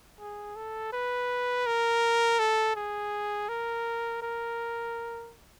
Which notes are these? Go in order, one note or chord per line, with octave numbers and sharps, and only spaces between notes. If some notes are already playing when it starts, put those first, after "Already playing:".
G#4
A4
B4
A#4
A4
G#4
A#4
A#4